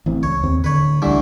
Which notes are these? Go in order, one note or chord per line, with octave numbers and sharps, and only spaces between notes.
A1 E3 C4
C#2 C#5
D#2 C4
D1 D3 B4 C#5
C#2 D3 E3 G3 A3